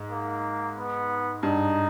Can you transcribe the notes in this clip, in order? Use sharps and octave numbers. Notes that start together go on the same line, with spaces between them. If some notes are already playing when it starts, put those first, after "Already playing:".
Already playing: G#2
A#3
B3
G2 D#4